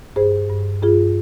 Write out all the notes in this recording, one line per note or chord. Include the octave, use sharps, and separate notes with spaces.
G2 G#4 C5
G2
G2 F4 G#4